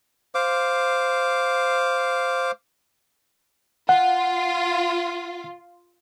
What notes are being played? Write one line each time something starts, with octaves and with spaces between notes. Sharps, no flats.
C5 F5 D6
F4 F#5